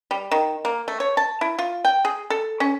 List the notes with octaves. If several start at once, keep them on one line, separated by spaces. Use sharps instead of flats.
G3
D#3
A#3
A3
C#5
A5
E4
F4
G5
G#4
A4
C#4